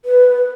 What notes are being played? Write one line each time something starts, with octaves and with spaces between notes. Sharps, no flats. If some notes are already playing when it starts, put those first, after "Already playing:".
B4